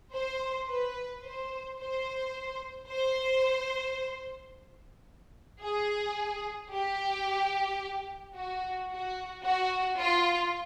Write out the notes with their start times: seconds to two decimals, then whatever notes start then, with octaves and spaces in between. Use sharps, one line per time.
0.14 C5
0.68 B4
1.24 C5
1.79 C5
2.88 C5
5.62 G#4
6.71 G4
8.36 F#4
8.90 F#4
9.45 F#4
10.00 F4